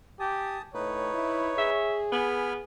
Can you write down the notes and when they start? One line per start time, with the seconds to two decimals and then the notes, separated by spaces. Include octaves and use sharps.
0.20 G4 G#5 A5 D#6
0.74 A2 D#4 B4 C#5
1.14 E4
1.58 G#4 E5
2.12 B3 G#5 B5 F6